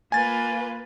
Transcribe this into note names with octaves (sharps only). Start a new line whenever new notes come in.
A#3 F4 B4 G#5 A6